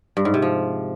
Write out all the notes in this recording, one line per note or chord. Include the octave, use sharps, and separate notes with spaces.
G2
G#2
C3
F3